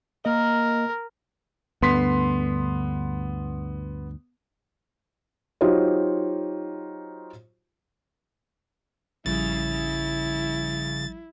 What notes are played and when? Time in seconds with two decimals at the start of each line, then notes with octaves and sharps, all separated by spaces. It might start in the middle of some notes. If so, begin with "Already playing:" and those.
0.25 A#3 A#4 D#5
1.82 D2 G2 D3 B3 C6 B6
5.61 F#3 D#4 F4 G4 C5 C#5
9.26 A1 C#3 F3 G3 E4 A6